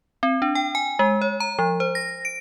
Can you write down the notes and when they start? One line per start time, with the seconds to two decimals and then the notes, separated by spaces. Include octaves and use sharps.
0.23 C4
0.42 D4
0.55 G5
0.75 G#5
0.99 G#3
1.21 C#5
1.40 A#5
1.59 F3
1.80 C5
1.95 A#6
2.25 D7